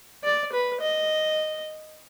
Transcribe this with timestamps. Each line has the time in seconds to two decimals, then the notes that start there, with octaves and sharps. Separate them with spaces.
0.24 D5
0.53 B4
0.81 D#5